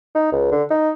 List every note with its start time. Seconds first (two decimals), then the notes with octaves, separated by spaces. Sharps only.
0.15 D#4
0.32 C#2
0.51 D3
0.71 D#4